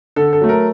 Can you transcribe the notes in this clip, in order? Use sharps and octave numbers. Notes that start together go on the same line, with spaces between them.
D3 A4
A4
F#3 A3
A#4